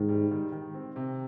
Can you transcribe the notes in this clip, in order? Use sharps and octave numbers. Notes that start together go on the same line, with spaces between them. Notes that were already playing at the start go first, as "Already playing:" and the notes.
Already playing: G#2 D#3
G3
D#3
D#3
C4
C3